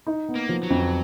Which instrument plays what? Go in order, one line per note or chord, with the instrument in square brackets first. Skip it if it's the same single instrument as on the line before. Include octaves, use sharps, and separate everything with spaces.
[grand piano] D#4
B3
[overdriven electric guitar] A#3
[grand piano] F3
[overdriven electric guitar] F#3
[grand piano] F2